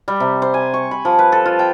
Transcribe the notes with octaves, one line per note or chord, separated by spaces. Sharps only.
G3
C3
C5
G#5
C#6
B5
F3
B4
A4
F4
G5